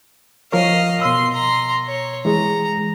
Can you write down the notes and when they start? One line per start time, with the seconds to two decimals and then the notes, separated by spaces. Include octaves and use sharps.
0.52 F3 A#4 C#5 D#5 F5
1.01 B2 C6 E6
1.33 A#5 C6
1.87 C#5
2.25 E3 G#3 G#4 A#5